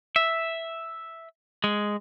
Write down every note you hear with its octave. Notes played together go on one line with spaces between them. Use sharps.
E5
G#3